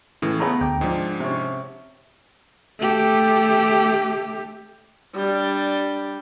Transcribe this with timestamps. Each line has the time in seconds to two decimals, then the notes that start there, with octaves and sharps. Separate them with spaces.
0.22 A2 C#3 E3 A3
0.40 A3 B3 G#4 B4 A#5
0.61 D2 G5 D6
0.81 G#2 F3 D4 D#4
1.20 C3 C#4
2.79 A3 G4
5.15 G3 D4